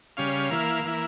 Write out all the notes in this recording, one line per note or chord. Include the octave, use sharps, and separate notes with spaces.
C#3 G3 C#4 F5
E3 A#3 E4
E3 A#3 E4